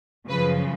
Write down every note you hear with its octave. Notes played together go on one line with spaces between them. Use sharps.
F#2 C#3 F3 B4